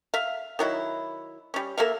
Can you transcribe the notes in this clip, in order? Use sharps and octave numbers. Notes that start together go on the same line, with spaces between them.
E5 F5
D#3 F#3 E4
G3 C#4
A#3 A4 E5 F5